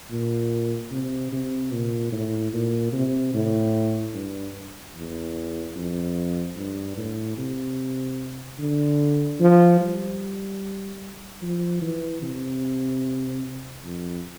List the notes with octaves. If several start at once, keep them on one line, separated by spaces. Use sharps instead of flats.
A#2
C3
C3
A#2
A2
A#2
C3
A2
G2
E2
F2
G2
A2
C3
D3
F3
G3
F3
E3
C3
F2